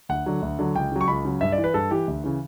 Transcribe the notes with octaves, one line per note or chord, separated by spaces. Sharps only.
D2 F#5
D3 F#3
D2
D3 F#3
C#2 G5
C#3 F#3
C#6
C#2 B5
C#3 F#3
G2 E5
D5
E3
B4
G2 A4
E3 G4
D2
C#3 E3